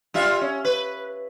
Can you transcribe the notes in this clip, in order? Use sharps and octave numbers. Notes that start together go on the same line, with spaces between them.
G3 F4 E5
C#4
B4